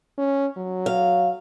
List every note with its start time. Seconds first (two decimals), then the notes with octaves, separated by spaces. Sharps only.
0.18 C#4
0.57 F#3
0.86 F5